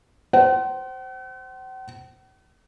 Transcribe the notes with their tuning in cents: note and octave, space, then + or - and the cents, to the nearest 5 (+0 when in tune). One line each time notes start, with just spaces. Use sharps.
C5 +0 F#5 +45